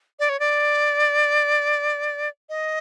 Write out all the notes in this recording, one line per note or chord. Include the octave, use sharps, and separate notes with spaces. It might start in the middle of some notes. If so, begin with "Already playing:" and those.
D5
C#5
D5
D#5